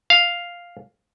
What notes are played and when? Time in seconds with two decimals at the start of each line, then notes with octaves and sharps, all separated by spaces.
0.10 F5